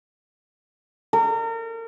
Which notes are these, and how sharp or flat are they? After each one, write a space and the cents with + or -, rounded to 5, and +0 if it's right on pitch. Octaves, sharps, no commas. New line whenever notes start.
A#4 -35